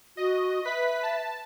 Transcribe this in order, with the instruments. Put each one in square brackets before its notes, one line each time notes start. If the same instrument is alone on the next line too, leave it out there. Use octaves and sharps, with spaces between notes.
[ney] F#4 [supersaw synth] D#5
[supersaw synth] B4 B6 [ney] E5
[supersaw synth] A5